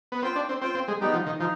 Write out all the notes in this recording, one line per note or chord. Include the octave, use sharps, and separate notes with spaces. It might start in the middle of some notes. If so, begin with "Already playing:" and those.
B3
C4 F4 C5 G5
D4
C4
C4 F4 C5 G5
C4
G#3
G3 G#3 B3 D#4
F3
D#3
F3 D#4